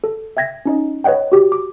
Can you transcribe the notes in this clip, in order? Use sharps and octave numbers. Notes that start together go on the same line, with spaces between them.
A4
E5 G5 G#6 A#6 B6
C#4 D#4 D#5
B4 C#5 D#5 F#5 G5
F#4 G4
D6